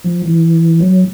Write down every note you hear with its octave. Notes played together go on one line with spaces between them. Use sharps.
F3
E3
F#3